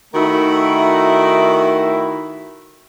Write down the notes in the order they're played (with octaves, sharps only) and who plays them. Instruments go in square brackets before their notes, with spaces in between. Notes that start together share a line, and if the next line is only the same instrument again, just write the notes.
[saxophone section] D#3 A3 E4 F#4 A#4